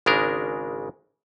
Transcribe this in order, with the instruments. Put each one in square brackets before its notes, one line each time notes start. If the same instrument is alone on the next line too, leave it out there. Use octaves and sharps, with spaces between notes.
[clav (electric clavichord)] G#1 C#3 G#3 D4 A#4